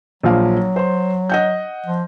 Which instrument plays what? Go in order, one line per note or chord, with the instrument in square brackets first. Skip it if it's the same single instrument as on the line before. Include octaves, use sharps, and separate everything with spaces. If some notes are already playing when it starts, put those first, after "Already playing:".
[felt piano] A#1 F3 F5 [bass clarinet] F#3
[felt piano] C5 C6
D#5 F#5 G6
[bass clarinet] F3